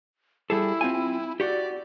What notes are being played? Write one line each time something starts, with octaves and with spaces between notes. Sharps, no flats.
G3 E4 G#4 A4
C4 F4 G#5
F#4 G4 D5